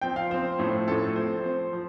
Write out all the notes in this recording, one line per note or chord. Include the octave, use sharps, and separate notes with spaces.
F3 C4 G5
F5
F3 C4 C5
A2 F3 A3 C4
A2 F3 A3 C4 A4
F3 C4 C5
F3 C4
F3